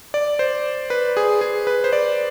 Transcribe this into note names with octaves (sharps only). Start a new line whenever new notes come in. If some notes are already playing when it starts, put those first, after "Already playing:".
D5
C5
B4
G#4
G#4
B4
C5
D5